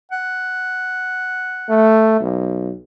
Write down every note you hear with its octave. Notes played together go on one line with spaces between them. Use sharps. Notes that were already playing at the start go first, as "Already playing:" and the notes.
F#5
A3
B1